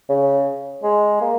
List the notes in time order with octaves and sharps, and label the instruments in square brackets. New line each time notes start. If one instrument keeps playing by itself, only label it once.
[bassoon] C#3
G#3
A#3